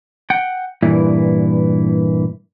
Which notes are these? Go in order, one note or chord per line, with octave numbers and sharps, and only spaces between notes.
F#5 G5
G2 A#2 E3 E4